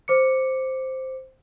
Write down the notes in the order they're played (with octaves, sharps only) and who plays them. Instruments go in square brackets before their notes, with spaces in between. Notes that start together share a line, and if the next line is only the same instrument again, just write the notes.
[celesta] C5 D6 C#7